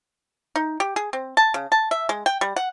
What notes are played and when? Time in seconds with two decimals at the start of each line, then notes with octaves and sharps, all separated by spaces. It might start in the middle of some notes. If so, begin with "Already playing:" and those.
0.56 D#4
0.80 G4
0.96 G#4
1.13 C4
1.37 A5
1.54 C#3
1.72 A5
1.91 E5
2.09 G#3
2.26 G5
2.41 G3
2.56 F#5